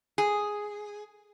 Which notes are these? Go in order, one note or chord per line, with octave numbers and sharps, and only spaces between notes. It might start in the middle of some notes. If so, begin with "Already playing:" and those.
G#4